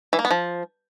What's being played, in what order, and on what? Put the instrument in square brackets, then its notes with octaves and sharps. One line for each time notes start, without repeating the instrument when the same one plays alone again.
[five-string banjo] E3
A#3
B3
F3